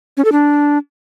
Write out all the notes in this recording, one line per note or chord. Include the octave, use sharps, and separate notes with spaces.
C#4
A4
D4